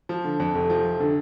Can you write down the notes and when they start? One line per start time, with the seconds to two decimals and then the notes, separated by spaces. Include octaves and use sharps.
0.09 F3
0.24 D3
0.40 F2
0.55 F1
0.70 F3
0.85 F1
1.00 D3